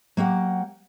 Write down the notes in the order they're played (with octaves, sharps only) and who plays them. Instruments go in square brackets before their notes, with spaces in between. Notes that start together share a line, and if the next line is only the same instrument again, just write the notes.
[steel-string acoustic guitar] F#3 A#3 G4 F#5